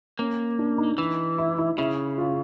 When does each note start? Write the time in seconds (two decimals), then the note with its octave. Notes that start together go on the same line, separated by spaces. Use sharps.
0.19 A#3 C#4
0.59 D4
0.78 D#4
0.98 E3
1.38 E4
1.58 E4
1.78 C#3 E4
2.18 F4